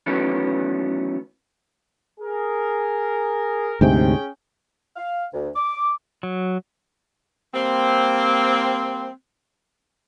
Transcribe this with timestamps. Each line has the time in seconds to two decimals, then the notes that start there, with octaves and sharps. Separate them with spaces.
0.06 D#3 E3 F#3 A3 B3 C#4
2.21 G#4 A#4
3.81 D2 G#2 C3 C#4 G#4 G5
4.97 F5
5.33 D2
5.56 D6
6.23 F#3
7.54 G3 A#3 C4